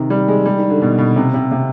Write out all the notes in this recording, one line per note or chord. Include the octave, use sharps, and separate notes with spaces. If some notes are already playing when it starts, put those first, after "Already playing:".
Already playing: C3 D#3
G3
G#3
G3
D#3
D3
B2
B2
C3
C3
C3